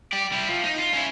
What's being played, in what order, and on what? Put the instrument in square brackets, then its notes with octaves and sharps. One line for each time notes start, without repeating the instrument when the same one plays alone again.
[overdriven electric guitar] G4 D5
G3 E4
F3
D#4
F4
C#4 E4